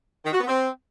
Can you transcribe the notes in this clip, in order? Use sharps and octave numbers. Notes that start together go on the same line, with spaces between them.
D#3
F#4
B3
C4